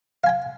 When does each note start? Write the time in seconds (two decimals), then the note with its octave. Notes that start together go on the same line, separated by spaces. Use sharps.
0.24 F5
0.26 G#5
0.29 G5